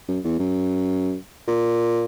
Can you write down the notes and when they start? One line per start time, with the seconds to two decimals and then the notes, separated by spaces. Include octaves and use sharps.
0.08 F#2
0.24 E2
0.39 F#2
1.48 A#2